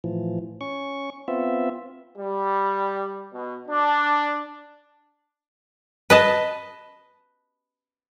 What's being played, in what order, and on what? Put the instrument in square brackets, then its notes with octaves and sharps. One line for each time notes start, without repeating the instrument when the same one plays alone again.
[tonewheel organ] A2 E3 F3
C#4 C#6
B3 C4 F4 E5
[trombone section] G3
B2
D4
[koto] B4 D#5 A5